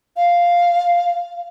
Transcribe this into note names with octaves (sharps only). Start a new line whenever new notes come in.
F5